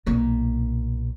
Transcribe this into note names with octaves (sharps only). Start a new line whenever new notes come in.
B1 A#2